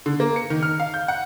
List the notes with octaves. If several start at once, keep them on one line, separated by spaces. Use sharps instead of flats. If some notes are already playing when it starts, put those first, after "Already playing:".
D3
A#3
C#7
D#3
F6
F5
G6
F#5